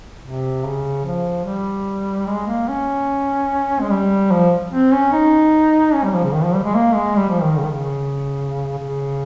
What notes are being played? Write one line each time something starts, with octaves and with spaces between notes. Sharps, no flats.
C3
C#3
F3
G3
G#3
A#3
C#4
G#3
G3
F3
C4
C#4
D#4
C#4
G3
F3
C#3
D#3
F3
G3
G#3
A#3
G#3
G3
F3
D#3
C#3
D#3
C#3
C#3